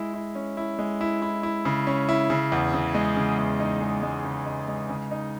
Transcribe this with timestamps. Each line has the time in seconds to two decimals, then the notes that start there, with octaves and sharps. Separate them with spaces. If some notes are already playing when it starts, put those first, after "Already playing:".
Already playing: G#3 E4
0.14 E4
0.35 C#4
0.57 E4
0.79 G#3
1.01 E4
1.22 E4
1.43 E4
1.65 C#3
1.87 C#4
2.09 E4
2.30 C#3
2.52 E2
2.74 C#3
2.95 G#3
3.16 C#3
3.38 E2
3.60 D#4
3.81 G#3
4.03 G#3
4.25 C#3
4.46 D#4
4.68 G#3
4.90 C#3
5.11 D#4